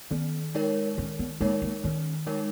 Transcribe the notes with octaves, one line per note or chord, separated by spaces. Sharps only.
D#3 B3
G#3 D#4 A#4 C#5
D#3 C#4
B3
G#3 A#3 D#4 A#4 C#5
A#3
D#3 C#4
G#3 D#4 A#4 C#5